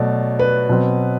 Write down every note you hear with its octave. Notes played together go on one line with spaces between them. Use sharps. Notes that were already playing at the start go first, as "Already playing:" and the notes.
Already playing: B2 F#3 A3 D5
B4
B2 F#3 C4